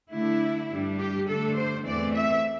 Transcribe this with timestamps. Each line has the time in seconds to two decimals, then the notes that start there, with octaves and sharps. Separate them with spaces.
0.12 D3 A3 D4 E4
0.70 G2 G3 D4
0.99 G4
1.28 D3 A3 D4 A4
1.57 C5
1.86 E2 E3 A3 C4 D5
2.15 E5